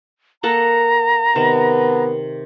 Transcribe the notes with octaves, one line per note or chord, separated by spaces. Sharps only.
A#3 A4 F#5 A#5
C3 D#3 B3